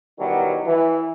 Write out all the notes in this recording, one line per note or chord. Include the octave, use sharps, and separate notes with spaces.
B2 D#3 E3 F#3 G3
E3